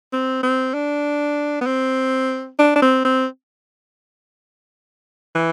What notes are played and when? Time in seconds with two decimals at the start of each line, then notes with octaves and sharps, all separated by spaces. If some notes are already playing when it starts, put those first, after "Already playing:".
0.13 C4
0.43 C4
0.74 D4
1.61 B3
1.66 C4
2.59 D4
2.75 D4
2.82 C4
3.05 C4
5.35 E3